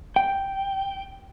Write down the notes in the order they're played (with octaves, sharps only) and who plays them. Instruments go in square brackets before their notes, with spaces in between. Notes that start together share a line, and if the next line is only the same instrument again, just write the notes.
[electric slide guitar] G5